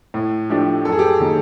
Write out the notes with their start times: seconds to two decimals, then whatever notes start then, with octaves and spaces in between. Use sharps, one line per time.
0.14 A2
0.50 F3 A3 D4 G4
0.85 F#2 A4
0.92 G#4
0.99 G4
1.07 G#4
1.20 D#3 F#3 A#3